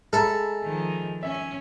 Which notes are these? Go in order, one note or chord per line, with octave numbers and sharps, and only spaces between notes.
G#3 A4 E5 A#5 B5
D#3 F3
C#4 E5